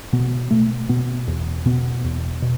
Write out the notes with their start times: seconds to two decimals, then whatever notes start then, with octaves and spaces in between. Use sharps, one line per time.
0.13 B2 B3
0.50 B2 A3
0.89 B2 B3
1.28 E2
1.66 B2 B3
2.04 E2
2.42 B2